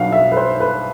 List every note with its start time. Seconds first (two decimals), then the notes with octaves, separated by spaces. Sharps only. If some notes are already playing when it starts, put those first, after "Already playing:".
Already playing: B1 B2 F#3 B3 D4 F5 F#5
0.12 E5
0.32 B4
0.37 C5
0.60 B4